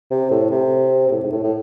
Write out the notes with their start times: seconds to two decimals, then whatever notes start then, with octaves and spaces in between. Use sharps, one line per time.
0.11 C3
0.31 A2
0.51 C3
1.07 C3
1.11 A2
1.23 G#2
1.32 A2
1.44 A2